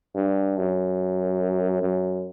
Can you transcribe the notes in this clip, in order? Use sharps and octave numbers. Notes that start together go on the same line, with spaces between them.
G2
F#2
F#2